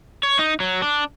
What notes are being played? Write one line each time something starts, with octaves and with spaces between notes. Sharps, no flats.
C#5
D#4
F#3
D4